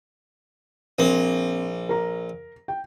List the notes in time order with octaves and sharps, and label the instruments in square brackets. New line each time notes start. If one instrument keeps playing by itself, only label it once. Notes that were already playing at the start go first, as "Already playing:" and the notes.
[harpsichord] A#1 A#3 [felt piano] C4
[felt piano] A#4 A#5
G5